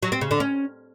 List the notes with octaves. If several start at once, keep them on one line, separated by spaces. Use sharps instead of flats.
F#3
C4
C#3
D3
C#4